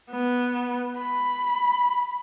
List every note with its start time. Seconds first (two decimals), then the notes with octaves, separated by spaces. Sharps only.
0.11 B3
0.98 B5